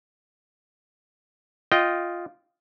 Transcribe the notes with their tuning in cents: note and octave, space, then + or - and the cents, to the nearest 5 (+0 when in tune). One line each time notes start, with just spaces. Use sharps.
F4 +0 D#5 +0 G5 -10